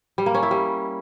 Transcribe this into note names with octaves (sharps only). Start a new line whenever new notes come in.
G3
A#3
C#4
E4
G3